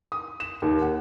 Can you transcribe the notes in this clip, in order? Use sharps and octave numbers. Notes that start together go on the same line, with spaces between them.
D#6
E7
D#2
F#5